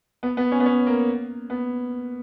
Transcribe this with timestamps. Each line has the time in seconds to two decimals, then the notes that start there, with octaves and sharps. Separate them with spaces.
0.23 B3
0.37 B3
0.52 C#4
0.60 B3
0.66 C#4
0.87 A#3
1.50 B3